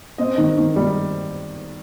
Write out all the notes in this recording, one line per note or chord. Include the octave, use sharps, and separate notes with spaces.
C4 D#5
D#3
D#3
G3